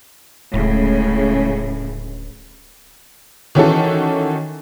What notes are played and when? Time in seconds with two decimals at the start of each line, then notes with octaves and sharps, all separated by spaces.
0.54 D1 A2 C#3 G#3
3.55 D#3 E3 C#4 E4 F#4 A4